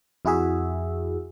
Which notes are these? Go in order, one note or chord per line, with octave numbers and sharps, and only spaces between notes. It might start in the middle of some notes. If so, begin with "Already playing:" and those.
F2 E4 F#4 G#4 E5